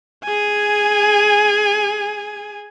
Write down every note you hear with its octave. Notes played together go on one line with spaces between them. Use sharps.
G#4 G#5